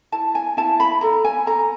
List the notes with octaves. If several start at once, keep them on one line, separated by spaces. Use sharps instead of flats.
E4 A5
G#5
E4 A5
B5
A4 A#5
G#5
A4 A#5